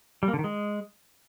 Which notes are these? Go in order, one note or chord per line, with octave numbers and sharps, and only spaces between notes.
G3
A#3
D3
D#3
G#3